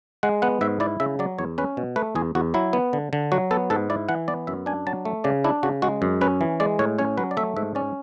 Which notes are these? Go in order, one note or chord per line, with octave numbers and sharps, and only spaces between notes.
G#3 F#5
B3 F#5
G#2 E5
E4 D5
C#3 E5
F#3 D5
E2 C#5
C#4 B4
B2
A3 B4
E2 G#4
E2 F#4
F#3 E4
B3
D3
D3
F#3 F#4
B3 A4
G#2 A4
E4 D5
E3 F#5
B3 D5
F#2 E5
D4 G#5
F#3 A5
A3
C#3 D5
D4 E4
C#3 F#4
G#3 F#4
F#2
C#4 B4
E3
G#3 D5
A2 C#5
C#4 C#5
F#3 B4
D5
A3 E5
G#2 E5
C#4 D5